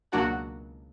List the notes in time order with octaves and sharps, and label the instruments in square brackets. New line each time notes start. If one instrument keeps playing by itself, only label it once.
[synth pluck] C#2 B2 F#3 A#3 D4 [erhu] F#4